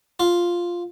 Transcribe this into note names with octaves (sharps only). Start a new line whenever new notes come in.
F4